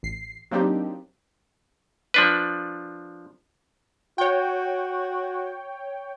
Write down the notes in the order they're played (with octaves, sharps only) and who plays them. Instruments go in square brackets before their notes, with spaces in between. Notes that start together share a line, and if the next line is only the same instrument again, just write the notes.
[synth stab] A1 C7
F#3 A#3 C4 D4 D#4 G4
[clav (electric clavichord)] F3 D4 B4
[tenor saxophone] F#4 [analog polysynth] C#5 G5